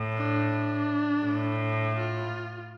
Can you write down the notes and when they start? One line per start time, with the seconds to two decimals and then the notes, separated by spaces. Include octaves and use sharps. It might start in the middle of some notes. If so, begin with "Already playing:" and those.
Already playing: A2
0.17 D4
1.25 A2
1.96 F4